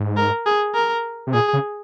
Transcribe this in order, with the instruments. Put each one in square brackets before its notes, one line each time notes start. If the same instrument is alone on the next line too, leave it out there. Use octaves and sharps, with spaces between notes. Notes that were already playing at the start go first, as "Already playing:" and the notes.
Already playing: [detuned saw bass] G#2
[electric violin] A#4
G#4
A#4
[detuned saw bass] C3
[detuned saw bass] A#2 [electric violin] G#4
[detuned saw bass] C#3